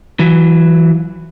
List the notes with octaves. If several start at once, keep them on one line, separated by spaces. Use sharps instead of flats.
E3 F#3